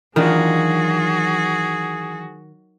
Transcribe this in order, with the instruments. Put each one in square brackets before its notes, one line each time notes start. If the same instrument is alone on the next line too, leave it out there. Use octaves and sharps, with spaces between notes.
[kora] D#3 [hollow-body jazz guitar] E3 D4 F4 [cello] F#3 F#4 [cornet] G#4